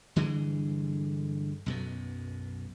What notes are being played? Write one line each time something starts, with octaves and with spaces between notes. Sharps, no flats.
G2 D3 E3 G#3
B1 F#2 B2